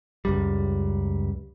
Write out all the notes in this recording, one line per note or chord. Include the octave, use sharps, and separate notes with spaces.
C#2 F#2 G3